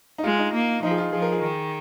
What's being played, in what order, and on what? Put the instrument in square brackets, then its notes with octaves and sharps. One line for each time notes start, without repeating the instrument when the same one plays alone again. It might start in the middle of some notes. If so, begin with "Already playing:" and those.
[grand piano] D#4
[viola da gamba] G#3 [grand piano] F4
[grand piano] D#4
[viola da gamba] A#3
[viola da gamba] F3 [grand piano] D#4
[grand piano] G#4
F4
[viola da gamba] F3 [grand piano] G#4
[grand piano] A#4
G#4
[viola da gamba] D#3